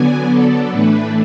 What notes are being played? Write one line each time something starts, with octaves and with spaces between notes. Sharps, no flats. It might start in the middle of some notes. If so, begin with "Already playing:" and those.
Already playing: D3 F#3 B3 D4 G#5
A4
A2 E3 A3 D4 B4